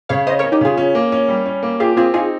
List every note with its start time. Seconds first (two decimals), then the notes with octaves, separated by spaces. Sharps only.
0.09 C#3 C#5 F5
0.27 C#4 C5 D#5
0.39 C#4 A#4 C#5
0.52 D#4 G4
0.61 C#3 F4 G#4
0.77 C#4
0.95 A#3
1.12 C#4
1.28 G3
1.46 C#4
1.63 A#3
1.80 F4 G4 G#4
1.97 C4 F4 G#4
2.14 D#4 F4 G#4